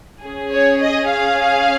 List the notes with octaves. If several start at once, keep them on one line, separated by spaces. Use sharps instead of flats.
C#4 G#4
C#5
D#5
F5